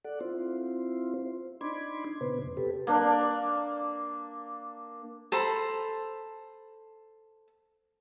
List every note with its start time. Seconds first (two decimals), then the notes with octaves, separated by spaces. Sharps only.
0.05 A4 D5 F#5
0.21 C4 E4 F4 C5
1.61 D4 D#4 B5 C6 D6 G#6
2.21 A#2 C#3 B3 B4 C5
2.42 F2 C3
2.57 G4 A4 B4
2.87 A#3 D4
5.32 A4 C5 A#5 B5